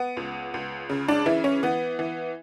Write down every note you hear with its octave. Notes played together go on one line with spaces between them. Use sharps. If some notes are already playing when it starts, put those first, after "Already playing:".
Already playing: B3
C#2
C#2
C#3
D4
E3 E4
C#4
E3 B3
E3